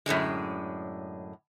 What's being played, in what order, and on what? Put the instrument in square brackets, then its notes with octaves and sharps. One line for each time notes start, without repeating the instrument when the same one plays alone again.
[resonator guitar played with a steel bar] F#2 A2 D3 G#3